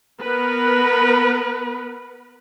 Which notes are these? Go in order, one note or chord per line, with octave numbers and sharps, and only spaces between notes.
B3 A#4 B4